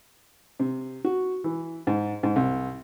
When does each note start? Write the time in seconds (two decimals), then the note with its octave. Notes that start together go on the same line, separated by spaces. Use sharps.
0.60 C3
1.05 F#4
1.44 E3
1.87 G#2
2.23 G#2
2.36 C2